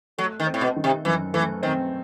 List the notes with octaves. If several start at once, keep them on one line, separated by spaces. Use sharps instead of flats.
F#3 A3
D#3
C4
A2
B2
D#3
C3
F#2 E3
E3 A3
D#3 C4